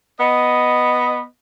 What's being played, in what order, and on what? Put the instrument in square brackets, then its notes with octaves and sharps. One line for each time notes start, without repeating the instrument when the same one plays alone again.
[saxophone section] B3 D#5